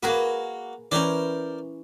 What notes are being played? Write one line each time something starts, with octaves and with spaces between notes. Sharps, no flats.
A#3 F#4 G#4 A#4 B4
E3 C#4 A#4 C5 D5